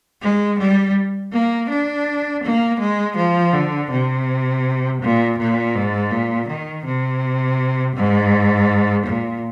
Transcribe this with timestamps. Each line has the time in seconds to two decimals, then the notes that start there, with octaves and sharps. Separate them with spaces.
0.22 G#3
0.59 G3
1.32 A#3
1.70 D4
2.43 A#3
2.80 G#3
3.17 F3
3.53 D3
3.90 C3
5.02 A#2
5.39 A#2
5.75 G#2
6.11 A#2
6.48 D#3
6.85 C3
7.96 G#2
9.06 A#2